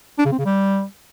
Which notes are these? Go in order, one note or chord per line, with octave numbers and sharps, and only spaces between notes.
D4
C#3
C4
C#3
G3